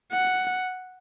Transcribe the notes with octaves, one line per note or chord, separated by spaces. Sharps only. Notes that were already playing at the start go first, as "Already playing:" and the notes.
F#5